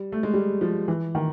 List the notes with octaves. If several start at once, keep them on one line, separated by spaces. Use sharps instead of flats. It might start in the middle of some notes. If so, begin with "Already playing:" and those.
Already playing: G3
A3
G#3
G3
F3
E3
D#3